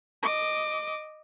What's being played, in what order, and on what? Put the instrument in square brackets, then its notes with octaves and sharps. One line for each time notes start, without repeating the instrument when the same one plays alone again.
[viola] D#5 D6